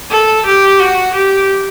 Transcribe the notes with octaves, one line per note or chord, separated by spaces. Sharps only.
A4
G4
F#4
G4